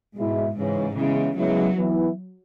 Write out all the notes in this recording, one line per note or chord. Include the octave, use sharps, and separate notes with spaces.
G#2 B2 G#3 E4
G#2 C#3 E3 C#4
C#3 E3 G#3 B3 E4
C#3 F#3 G#3 B3 E4
E3 B3 E4